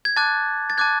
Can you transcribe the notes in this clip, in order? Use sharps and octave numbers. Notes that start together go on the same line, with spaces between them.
G#6
A5 D6 F#6 A6
A6
A5 D6 F#6 G#6